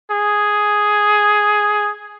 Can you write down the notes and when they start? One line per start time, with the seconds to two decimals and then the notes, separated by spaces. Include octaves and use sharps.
0.11 G#4